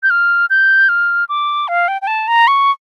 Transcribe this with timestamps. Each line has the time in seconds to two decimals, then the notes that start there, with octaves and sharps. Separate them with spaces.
0.03 G6
0.10 F6
0.50 G6
0.89 F6
1.29 D6
1.68 F5
1.88 G5
2.02 G5
2.07 A5
2.28 A#5
2.48 C#6